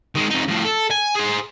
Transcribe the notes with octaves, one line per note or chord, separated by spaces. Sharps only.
D#3 G#3
F2 D#4
F2 A2
A4
G#5
G#4 C5